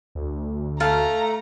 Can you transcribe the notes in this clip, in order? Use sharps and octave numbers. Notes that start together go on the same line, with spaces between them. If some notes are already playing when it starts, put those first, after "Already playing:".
D2
A3 F5 A5 A#5